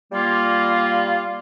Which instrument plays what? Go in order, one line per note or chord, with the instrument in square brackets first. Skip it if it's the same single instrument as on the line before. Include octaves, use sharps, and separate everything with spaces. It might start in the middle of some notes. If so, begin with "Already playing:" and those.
[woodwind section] G3 A#3 F4